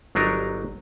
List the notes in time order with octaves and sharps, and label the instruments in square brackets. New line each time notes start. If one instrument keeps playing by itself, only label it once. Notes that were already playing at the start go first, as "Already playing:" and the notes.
[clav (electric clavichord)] G1 F#3 D4 D#4 A#4 A#5